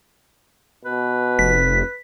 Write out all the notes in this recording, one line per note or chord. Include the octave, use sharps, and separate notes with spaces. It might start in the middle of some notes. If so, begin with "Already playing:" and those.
B2 B4
F1 B6